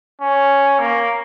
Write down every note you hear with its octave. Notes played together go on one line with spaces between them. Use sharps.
C#4
A#3